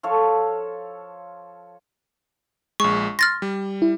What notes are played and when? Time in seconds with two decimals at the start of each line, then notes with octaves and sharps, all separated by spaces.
0.03 F3 A4 C#5 F5
2.80 A#1 G#3 C#6
3.19 C6 F6 A6 A#6
3.42 G3
3.82 E4